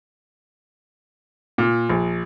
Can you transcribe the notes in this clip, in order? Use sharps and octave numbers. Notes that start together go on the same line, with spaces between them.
A#2
A#1